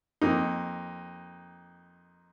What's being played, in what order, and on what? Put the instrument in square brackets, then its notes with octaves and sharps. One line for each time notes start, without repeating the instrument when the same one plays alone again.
[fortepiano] F2 A#3 D#4